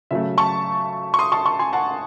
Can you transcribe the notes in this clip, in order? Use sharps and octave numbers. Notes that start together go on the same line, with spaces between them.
C#3 F#3 A3 E5
A5 C#6
C#6
C6 D#6
A5 C#6
A5 C#6
G#5 C6
F#5 A5